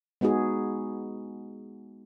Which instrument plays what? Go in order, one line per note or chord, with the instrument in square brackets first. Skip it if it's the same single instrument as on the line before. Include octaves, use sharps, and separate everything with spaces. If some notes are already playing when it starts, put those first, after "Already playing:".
[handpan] G#3 B3 D#4 F#4 G#4